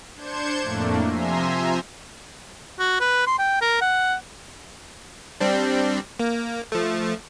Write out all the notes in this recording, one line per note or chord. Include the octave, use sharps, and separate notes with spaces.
D4 C5 G6 G#6 C#7 E7
F2 A2 A3 A#3 D4
C3 F3 E5 G#5 A#5 C6
F#4
B4
C6
G5
A#4
F#5
G3 C4 D4
A#3
F3 A3